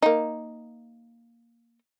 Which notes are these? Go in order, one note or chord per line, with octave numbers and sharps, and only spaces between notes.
A#3 D#4